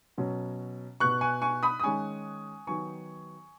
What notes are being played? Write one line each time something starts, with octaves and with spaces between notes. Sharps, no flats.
B2 F#3 C#4
B2 B3 C#6 F#6
G#5 C#6
G#5 C#6
B5 D#6
D#6
D#3 G#3 C#4 G#5 C#6
D#3 F#3 B3 G#5 C#6